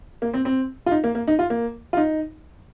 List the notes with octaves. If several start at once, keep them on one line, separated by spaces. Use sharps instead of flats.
A#3
C4
C4
F4
D#4
A#3
A#3
D#4
F4
A#3
F4
D#4